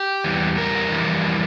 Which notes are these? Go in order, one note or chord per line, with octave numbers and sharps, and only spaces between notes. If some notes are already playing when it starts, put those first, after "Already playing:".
Already playing: G4
E2 E3 G3
A#4
F2 E3 G3